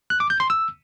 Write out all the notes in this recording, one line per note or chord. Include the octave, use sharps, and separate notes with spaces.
F#6
D6
G6
C6
E6